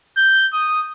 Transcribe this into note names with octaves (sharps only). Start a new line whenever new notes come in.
G6
D#6